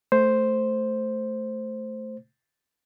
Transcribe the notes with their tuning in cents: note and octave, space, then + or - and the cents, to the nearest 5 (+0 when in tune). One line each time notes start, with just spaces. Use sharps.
A3 +0 C5 +0